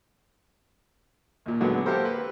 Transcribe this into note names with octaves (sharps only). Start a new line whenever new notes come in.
D#2 A#2
D3 F#3 G#3 B3
A#3 G4 A4 A#4 C5
B4